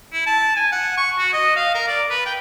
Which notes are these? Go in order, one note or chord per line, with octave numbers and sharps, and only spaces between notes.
E4
A5
G#5
F#5
C#6
F#4
D#5
F5
A#4
D5
B4
G5